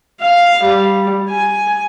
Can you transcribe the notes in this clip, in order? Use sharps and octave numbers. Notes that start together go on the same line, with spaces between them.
F5
G3
G#5